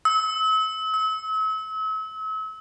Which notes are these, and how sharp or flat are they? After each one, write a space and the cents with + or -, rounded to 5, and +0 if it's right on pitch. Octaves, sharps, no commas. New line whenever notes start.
E6 -40
E6 -40